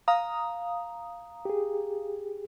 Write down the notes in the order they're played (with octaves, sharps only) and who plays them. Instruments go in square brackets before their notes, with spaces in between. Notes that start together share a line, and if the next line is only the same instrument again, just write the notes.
[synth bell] F5 A#5 D#6
[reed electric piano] G4 G#4